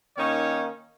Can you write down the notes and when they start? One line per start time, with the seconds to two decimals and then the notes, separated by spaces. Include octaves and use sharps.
0.17 D#3 A#3 C#4 D#4 C#5